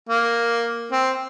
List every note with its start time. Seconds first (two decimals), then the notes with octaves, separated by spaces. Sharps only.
0.09 A#3
0.92 C4